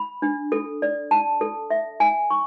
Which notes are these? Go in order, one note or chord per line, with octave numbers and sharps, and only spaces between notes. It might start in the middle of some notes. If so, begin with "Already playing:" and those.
Already playing: B5
D4
A4
D5
A5
A4
E5
G#5
C#6